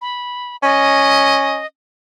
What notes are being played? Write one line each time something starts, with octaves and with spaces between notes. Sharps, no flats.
B5
C#4 D#5